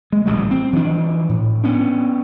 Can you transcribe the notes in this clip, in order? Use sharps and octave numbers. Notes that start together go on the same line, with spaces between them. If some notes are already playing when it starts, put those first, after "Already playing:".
G#3
D1 A1 G#2 G3
C4
E3 F3 A3 D4
A2
B3 C#4 D4